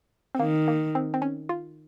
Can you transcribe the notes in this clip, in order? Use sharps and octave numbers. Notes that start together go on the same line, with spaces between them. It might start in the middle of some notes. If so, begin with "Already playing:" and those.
C4
D#3 A#3
A#3
C4
C4
C#4
F4